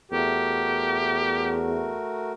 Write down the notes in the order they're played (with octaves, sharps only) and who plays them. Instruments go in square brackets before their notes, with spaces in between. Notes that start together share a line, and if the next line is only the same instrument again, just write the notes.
[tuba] E2 [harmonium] A3 F#4 A#4 [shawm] G4